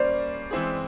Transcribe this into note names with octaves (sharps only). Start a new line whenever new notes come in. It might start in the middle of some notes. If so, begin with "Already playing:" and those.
Already playing: G3 A#3 C#4 C5 D5
E3 G#3 C4 E4 G#4